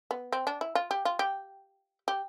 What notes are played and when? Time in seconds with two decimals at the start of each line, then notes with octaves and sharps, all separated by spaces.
0.11 B3
0.33 C4
0.47 D4
0.61 E4
0.75 F4
0.91 G4
1.05 F4
1.19 G4
2.08 G4